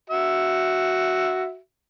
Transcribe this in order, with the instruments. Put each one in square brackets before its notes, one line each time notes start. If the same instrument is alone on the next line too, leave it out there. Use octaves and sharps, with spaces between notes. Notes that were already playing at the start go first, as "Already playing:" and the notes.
[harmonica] F#4 E5